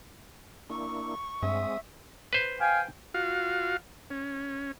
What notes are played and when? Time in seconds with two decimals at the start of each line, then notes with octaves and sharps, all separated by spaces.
0.70 A#3 D4 E4 C#6
1.43 G2 G#3 C4 E5 D#6
2.33 B4 C5
2.59 F5 G5 G#5
3.14 F4 F#4 F5
4.10 C#4